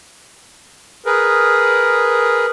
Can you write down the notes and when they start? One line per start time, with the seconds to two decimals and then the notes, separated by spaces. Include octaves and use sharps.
1.06 G#4 A#4 B4